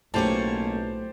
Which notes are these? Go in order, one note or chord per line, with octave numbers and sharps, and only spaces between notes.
B1 A2 A#3 C#4 G4 C5 C#5 A5